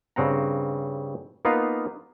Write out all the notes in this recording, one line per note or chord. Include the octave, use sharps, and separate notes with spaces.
G2 C#3 C4 F#5 A#5
A#3 B3 D#4 F4 B4 F5